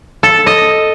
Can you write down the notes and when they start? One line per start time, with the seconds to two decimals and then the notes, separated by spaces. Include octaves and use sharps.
0.23 A4
0.46 D#5